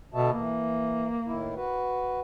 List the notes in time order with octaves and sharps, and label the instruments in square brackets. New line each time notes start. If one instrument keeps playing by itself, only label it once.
[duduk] B2 [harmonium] D3 E5 A5
[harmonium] E3 [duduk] A#3
[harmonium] A2 D#3 E4
F#4 B4